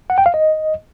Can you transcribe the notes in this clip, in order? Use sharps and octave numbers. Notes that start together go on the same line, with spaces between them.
F#5
G5
F5
D#5